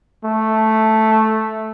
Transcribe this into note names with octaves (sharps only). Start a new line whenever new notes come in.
A3